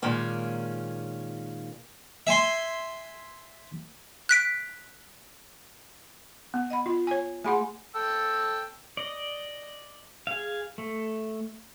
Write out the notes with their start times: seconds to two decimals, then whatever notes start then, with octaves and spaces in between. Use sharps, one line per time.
0.02 A#2 D#3 G#3 A#3 C#4
2.27 E5 G#5 C6
4.29 F#6 B6 D7
6.54 B3
6.70 D#5 F#5 B5
6.86 F4
7.07 C#5 G#5
7.44 A3 G#4 F#5 G#5 B5 C6
7.95 A4 G5 E6
8.97 D5 D#5
10.27 G#4 F5
10.78 A3